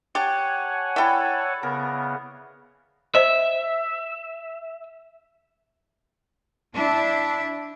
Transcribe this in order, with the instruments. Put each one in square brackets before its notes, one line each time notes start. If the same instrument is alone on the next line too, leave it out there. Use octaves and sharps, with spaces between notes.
[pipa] G4 [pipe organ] C#5 F#5 G#5 [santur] A5
[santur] E4 A4 D5 [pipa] E5 G5
[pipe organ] C#3 B3 [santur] A#4
[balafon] C5 D#5 [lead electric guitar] E5
[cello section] D4 E4 E5